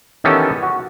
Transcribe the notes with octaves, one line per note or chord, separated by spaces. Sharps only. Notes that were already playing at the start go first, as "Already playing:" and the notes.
D#3 E3 B3 C#4 G4 A4
F#4